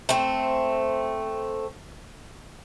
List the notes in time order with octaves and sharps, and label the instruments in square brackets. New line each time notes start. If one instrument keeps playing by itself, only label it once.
[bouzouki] A3 C4